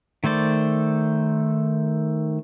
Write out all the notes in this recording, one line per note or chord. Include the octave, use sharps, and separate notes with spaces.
D#3 A3 C5 D5